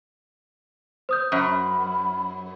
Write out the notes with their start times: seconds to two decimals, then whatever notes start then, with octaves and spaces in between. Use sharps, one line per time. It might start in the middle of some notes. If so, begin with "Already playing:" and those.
1.09 C5 D#6 G6
1.32 F#2 B5